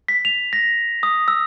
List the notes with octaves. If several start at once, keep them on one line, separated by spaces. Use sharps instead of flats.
B6
F7
A#6
D#6
E6